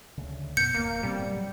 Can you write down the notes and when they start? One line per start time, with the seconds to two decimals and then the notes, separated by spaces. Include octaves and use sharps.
0.18 D2 C#3
0.57 F#2 B2 B3 G6 C#7
0.75 D1 A#3
1.03 A2 C3 G3 C4
1.26 A2 F#3